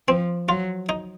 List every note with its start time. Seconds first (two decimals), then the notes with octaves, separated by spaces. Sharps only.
0.08 F3 C4
0.48 F#3 F4
0.89 D#4